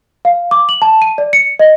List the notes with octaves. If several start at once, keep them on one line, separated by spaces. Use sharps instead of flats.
F5
D6
F#7
A5
D#7
D5
C#7
D#5